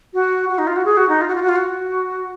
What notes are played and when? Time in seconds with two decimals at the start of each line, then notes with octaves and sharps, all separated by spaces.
0.14 F#4
0.49 F#4
0.58 D#4
0.67 F4
0.76 F#4
0.85 G#4
0.97 F#4
1.09 D#4
1.21 F4
1.28 F#4
1.35 F4
1.42 F#4
1.49 F4
1.56 F#4